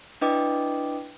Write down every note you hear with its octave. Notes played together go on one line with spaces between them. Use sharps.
D4 E4 B4 D#5 G5 D6